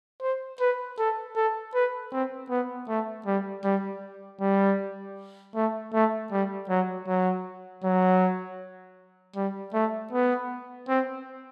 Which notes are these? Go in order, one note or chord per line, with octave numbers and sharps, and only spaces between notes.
C5
B4
A4
A4
B4
C4
B3
A3
G3
G3
G3
A3
A3
G3
F#3
F#3
F#3
G3
A3
B3
C4